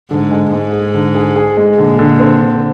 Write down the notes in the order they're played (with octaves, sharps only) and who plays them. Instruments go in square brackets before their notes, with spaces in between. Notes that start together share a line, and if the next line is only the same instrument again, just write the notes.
[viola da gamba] G#2 [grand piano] D3
[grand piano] G#3
[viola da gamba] G#2 [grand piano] G#3
[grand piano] G#4
D3
G#4
G#4
G#3
[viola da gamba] A#2 [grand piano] D3
[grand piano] D3
C4
D3